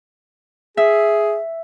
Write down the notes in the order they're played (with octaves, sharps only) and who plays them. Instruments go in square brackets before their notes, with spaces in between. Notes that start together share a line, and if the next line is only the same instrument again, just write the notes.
[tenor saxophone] G#4 [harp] E5